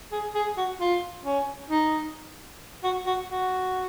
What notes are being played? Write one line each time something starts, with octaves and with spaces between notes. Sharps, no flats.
G#4
G#4
F#4
F4
C#4
D#4
F#4
F#4
F#4